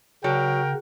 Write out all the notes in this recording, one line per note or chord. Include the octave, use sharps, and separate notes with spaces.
C#3 F#3 A#4 F#5 G5